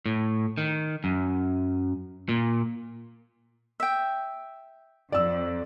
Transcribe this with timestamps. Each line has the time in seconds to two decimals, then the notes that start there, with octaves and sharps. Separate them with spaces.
0.06 A2
0.58 D#3
1.04 F#2
2.29 A#2
3.80 E5 G5
5.12 F2 D5 E6